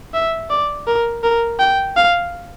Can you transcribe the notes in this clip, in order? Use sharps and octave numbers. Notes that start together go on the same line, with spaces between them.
E5
D5
A#4
A#4
G5
F5